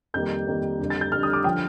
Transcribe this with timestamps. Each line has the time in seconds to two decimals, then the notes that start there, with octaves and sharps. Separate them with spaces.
0.14 F2 D#3 G3 A#3 G6
0.47 F2 D#3 G3 A#3
0.79 F2 D3 G3
0.90 A6
1.01 G6
1.12 F2 D3 G3 F6
1.23 D#6
1.33 D6
1.44 D3 F3 G5